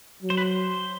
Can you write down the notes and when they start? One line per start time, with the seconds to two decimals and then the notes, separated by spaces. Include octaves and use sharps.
0.23 F#3
0.30 C5
0.37 B4
0.45 C5